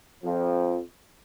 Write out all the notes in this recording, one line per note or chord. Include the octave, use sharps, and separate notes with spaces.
F2 F3